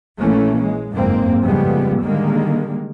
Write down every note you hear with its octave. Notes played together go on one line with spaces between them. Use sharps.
A#1 E3 A3 A#3 C#4
G#3
F#1 F2 G#2 A#3 C4
A2 C#3 F3 G3 G#3 B3
D3 D#3 G3 G#3 A#3